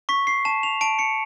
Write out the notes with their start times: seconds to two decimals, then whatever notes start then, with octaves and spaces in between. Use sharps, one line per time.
0.09 C#6 B6
0.27 C7
0.45 A5 E7
0.63 F7
0.81 A5 D7
0.99 C#7